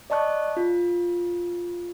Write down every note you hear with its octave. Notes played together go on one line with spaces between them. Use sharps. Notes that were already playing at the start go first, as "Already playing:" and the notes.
D5 D#5 A5 C#6 F#6
F4